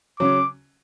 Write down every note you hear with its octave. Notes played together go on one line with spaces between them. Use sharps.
C#3 F#3 C#4 D6